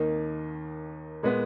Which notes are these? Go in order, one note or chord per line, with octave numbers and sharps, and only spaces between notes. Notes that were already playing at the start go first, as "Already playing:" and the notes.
Already playing: D#2 D#3 A#3 D#4
A#2 G#3 B3